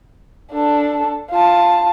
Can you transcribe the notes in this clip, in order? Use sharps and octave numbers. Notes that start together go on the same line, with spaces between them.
D4 A4
F4 A5